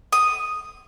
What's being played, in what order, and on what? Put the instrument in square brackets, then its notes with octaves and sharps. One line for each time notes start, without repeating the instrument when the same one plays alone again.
[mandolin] D#6